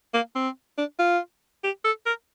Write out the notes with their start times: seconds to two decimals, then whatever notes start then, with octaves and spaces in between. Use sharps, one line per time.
0.14 A#3
0.36 C4
0.78 D4
0.99 F4
1.64 G4
1.85 A4
2.06 A#4